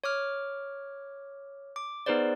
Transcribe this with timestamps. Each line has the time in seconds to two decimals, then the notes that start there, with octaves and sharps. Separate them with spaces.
0.04 C#5 D6 F6
1.76 D6
2.06 B3 D#4 G#4 B4 C5 D5